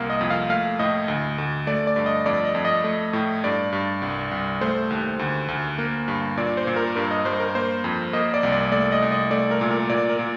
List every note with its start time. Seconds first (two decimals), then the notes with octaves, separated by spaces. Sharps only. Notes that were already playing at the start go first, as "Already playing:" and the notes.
Already playing: C2 A#3 F5
0.10 D#5
0.21 F2
0.30 F5
0.50 A3 F5
0.79 A2 D#5
1.08 D2
1.38 D2
1.67 A3 D5
1.87 D5
1.96 G2
2.06 D#5
2.26 F2 D5
2.45 D#5
2.55 F2
2.65 D#5
2.84 A3
3.13 A2
3.44 G2 D5
3.73 G2
4.02 C2
4.31 C2
4.61 A3 C5
4.90 D#2
5.19 D2
5.48 D2
5.78 A#3
6.08 G2
6.37 A#2 D5
6.57 C5
6.67 A#2
6.76 A#4
6.96 G2 A#4
7.11 D#5
7.25 G2 C5
7.40 A#4
7.55 A#3 C5
7.84 F2
8.13 A#3 D#5
8.34 D5
8.43 C2
8.52 D5
8.72 A3 D5
8.92 D#5
9.02 C2
9.12 D#5
9.31 A3 D5
9.51 A#4
9.61 A#2
9.71 A#4
9.89 A#2 D5
10.09 A#4
10.19 A#2